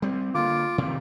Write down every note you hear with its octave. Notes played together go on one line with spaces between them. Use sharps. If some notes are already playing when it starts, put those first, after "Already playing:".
G3 C4
D3 A#3 F4 D6
C3 D#3 E3